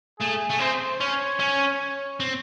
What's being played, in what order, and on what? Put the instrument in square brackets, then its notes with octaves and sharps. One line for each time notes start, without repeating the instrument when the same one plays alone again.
[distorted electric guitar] A3 [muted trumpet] G#4
[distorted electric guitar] A3
[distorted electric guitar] C4 [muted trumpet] C5
[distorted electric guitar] C#4 [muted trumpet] C#5
[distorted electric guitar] C#4
C4